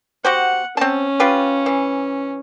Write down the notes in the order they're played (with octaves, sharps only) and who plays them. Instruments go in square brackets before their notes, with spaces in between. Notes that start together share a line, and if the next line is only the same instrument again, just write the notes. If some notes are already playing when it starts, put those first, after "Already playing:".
[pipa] F#4 G4 C5 [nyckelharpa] F#5
[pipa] C4 A5 [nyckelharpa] C#4
[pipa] F4 G4 B4
E3